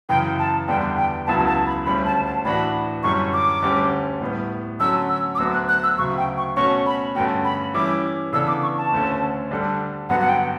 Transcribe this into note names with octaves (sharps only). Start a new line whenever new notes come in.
F#2 C#3 E3 G5
A5
E2 D3 G3 B3 D4 G5
G5
C#2 C#3 F#3 B3 E4 A5
A5
B5
D2 D3 G3 C#4 B5
A5
A5
A2 E3 A3 D4 F#4 B5
F#2 D3 G3 C#4 E4 C#6
D6
D2 D3 G3 C#4 G4
A2 G3 B3
D3 F#3 A3 C#4 E6
E6
D6
D2 D3 F#3 B3 F#4 E6
F#6
F#6
E6
D2 C#3 F#3 C#6
G5
C#6
B2 A3 C#4 F#4 C#5 C#6
B5
G2 D3 A3 C#4 F#4 G5
B5
E3 G3 C#4 E4 D6
C#3 E3 B3 D4 A4 E6
D6
C#6
A5
D2 D3 A3 C#4
D3 G3 D4 A4
G2 D3 F#3 B3 F#4 F#5
F#5
G5